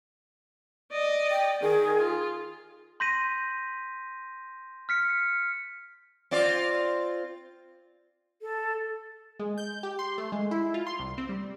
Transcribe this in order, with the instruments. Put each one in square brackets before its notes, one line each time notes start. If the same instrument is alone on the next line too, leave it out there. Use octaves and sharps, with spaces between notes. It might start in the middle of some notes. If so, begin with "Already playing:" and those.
[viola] D5 D#5
[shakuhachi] G5
[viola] D#3 [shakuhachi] G#4
[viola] F4
[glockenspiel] C6 G6 A#6 B6 D#7
F6 B6 C#7
[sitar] C4 F4 D5
[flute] A4
[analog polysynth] G#3
G6
G4
C6
A3
G#3
E4
F4
C6
C2
C4
G3